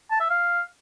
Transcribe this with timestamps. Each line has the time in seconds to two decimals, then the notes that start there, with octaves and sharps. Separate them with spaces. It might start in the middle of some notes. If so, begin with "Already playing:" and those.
0.11 A5
0.20 E5
0.30 F5